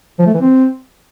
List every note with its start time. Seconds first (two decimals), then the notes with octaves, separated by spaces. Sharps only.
0.19 F3
0.26 A3
0.34 E3
0.41 C4